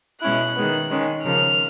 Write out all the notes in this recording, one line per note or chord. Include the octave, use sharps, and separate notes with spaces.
B2 G#3 C#4 E4 F#6
D#3 G#3 B3
D#3 G#3 C#4
C#3 F3 A#3 F6